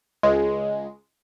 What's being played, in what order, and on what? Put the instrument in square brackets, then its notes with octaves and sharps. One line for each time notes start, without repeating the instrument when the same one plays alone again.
[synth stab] C#2 G#3